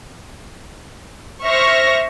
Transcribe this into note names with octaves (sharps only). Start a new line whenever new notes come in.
C5 E5 C#6 F6 A#6